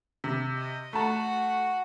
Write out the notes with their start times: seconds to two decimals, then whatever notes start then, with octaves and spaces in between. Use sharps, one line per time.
0.24 C3
0.55 D#5
0.93 A3 F#4 F#5 A5